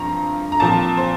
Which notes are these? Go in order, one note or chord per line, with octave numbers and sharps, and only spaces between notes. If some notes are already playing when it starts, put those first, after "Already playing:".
Already playing: G2 F3 C4 A#5
A#5
A#2 F3 C4 A5
C5